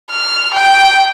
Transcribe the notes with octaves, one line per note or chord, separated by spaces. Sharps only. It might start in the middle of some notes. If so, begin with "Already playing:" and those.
F6
G5